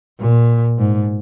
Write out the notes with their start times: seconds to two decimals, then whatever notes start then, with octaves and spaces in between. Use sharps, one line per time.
0.20 A#2
0.78 G#2